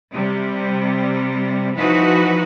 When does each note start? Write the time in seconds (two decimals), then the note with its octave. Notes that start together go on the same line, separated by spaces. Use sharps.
0.14 C3 G3
1.75 E3 F3 D#4 F#4 B4